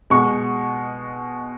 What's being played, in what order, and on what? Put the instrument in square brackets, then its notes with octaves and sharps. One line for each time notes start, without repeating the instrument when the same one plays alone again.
[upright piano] B2 G#3 C#6